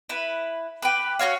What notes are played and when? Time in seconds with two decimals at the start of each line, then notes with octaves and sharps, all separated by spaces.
0.09 E4 B4
0.82 G4 B4
1.19 C#4 F#4 C#5 F5